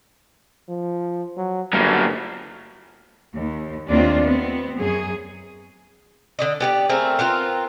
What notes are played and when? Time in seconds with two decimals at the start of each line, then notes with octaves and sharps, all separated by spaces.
0.68 F3
1.37 F#3
1.73 G1 F#3 A#3
3.33 D#2
3.88 D#2 A3 A#3 C4 D4 F4
4.21 B3 C4
4.77 F#2 F#3 G#4
6.39 D3 D5 D#5
6.60 B3 G4 D5
6.89 A3 C4 G#4 A#4
7.19 B3 C4 F4 A#4